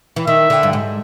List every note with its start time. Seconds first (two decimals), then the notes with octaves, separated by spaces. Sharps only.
0.16 E3
0.27 D#3 E5
0.50 D3
0.63 G2
0.73 G#2